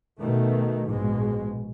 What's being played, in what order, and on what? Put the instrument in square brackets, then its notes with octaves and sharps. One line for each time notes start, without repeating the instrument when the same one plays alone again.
[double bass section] B2 D#3 A3
A#1 G#2 B2 G#3